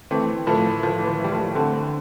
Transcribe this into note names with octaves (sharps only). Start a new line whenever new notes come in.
E3 A3 C4
A2 F3 A3
A2 F3
E3
F3
E3 G3
F3 A3
D3 A3 C4